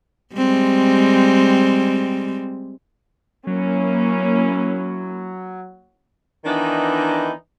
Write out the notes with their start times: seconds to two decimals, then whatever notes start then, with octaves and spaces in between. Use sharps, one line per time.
0.35 G3 G#3 C4
3.47 F#3 A#3 C#4 E4
6.45 D#3 E3 B3 D4 D#4